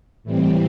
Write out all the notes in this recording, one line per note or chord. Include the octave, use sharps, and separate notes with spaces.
A2 E3 G3 C4